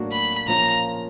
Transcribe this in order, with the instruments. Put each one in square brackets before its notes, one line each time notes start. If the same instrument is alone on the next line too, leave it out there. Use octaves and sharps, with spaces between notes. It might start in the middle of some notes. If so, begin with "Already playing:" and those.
Already playing: [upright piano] A2 F#3 A#3 D4 F#4
[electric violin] B5
[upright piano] A#2 F3 A#3 C#4 [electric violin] A#5